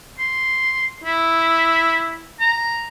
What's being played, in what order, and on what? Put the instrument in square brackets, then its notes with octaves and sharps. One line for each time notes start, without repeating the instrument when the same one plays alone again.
[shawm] C6
E4
A#5